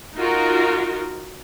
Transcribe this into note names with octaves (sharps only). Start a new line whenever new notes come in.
D#4 F4 F#4 A#4